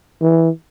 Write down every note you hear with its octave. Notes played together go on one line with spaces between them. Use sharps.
E3